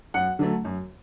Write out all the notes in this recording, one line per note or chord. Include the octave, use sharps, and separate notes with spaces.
F#2 F#5
D3 F#3 A3
F#2